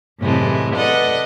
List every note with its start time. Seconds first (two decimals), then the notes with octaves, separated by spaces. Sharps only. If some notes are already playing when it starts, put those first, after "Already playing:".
0.20 F#2 A2 C3 E3 G#3 A3
0.75 A4 B4 D5 D#5 F#5